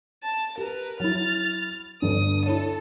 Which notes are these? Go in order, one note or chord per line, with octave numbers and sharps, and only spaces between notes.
A5
G4 A#4 B4
F#3 E4 F6 A6
G1 D2 G2 D#6
E4 A4 C#5